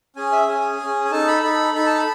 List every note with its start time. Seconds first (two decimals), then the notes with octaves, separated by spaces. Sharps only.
0.16 C#4 G#4 G#5
0.32 E5
0.47 C#4 G#4 G#5
0.79 C#4 G#4
1.05 G#5
1.11 D#4 A4 A5
1.27 B5
1.43 D#4 A4 B5
1.74 D#4 A4 B5
1.86 A5
1.99 B5